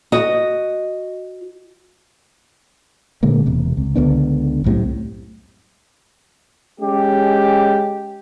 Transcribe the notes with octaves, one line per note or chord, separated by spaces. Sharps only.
F#4 D#5
A#2 D3 G#3 A#3
E1 C3
C#2
C#2 D3 B3 D4
C2 F#2 A2 C3
G#3 C#4 G4